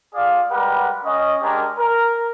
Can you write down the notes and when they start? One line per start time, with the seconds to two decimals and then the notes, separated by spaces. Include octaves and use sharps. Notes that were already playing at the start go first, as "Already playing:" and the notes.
0.14 F4 G#4 A4 D5 F5
0.49 G3 G#3 G4 A#4 B4 F#5
1.05 C#4 D#5
1.41 G#3 D4 G4 G#4 A#4
1.78 A#4